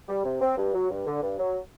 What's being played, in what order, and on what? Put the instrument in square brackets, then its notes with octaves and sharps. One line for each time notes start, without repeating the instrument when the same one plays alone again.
[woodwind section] G3
C3
C4
G2
F#3
G2
D3
G2
F#3